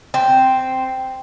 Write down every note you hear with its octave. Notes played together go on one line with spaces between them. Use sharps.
C4